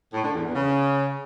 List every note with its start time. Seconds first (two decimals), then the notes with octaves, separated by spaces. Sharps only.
0.14 A2
0.24 D3
0.34 E2
0.45 E2
0.55 C#3